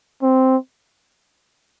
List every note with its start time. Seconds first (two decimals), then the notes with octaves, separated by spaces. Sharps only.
0.22 C4